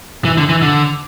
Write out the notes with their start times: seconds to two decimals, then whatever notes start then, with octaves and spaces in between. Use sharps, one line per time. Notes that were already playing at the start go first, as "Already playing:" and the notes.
0.25 E3
0.37 D3
0.49 E3
0.62 D3